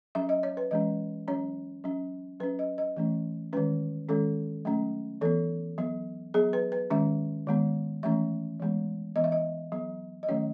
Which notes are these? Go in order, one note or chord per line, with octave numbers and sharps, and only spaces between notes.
F#3 C#4 E5
D#5
C#5
B4
E3 G#3 C#4 D#5
F#3 C#4 C#5
F#3 C#4
F#3 C#4 B4
D#5
D#5
E3 A3 C#4
D#3 G#3 C#4 B4
D#3 G#3 C#4 A4
F#3 A3 C#4
E3 B3 A4
F#3 B3
F#3 B3 G#4
B4
B4
D#3 G#3 C#4 E5
D#3 G#3 B3
E3 A3 C#4 E5
E3 G#3 B3
E3 B3 D#5
E5
D#5
F#3 B3
D#5
D#3 F#3 A3 C#4 C#5